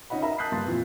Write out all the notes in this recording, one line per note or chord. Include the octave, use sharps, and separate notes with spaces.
C#4 D#4 D#5 F#5 B5
A#4 D#5 E5 A#5 B5
A5 D#6 F#6 G6 B6 C7
G2 A#3 C6 A6
F2 A#2 E3 F3